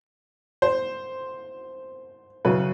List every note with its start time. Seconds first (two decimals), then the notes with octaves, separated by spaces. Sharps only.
0.62 C5
2.45 F#2 C#3 F#3 B4